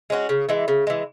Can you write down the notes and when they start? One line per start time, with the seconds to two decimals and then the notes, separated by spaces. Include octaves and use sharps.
0.10 G#3 C#4 F#4
0.29 C#3
0.49 E3 G#3
0.68 C#3
0.87 E3 G#3